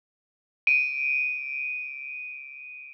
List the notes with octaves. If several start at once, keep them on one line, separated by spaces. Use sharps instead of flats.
D7 D#7